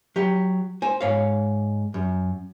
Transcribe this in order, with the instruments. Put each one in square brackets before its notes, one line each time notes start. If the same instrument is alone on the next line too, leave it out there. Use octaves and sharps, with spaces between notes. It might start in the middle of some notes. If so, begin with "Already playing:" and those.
[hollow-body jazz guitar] F#3 G4
C5 G#5
G#2 C#5 F5
F#2